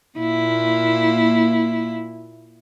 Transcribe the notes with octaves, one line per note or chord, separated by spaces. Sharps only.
A#2 A#3 E4